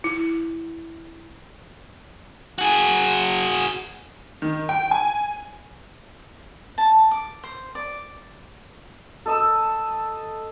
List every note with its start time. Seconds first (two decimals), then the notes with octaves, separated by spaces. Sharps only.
0.04 E4
2.59 F#4 G#4
4.42 D#3
4.69 G5
4.91 G#5
6.78 A5
7.11 D6
7.43 C5
7.75 D5
9.26 A4 D#5 E6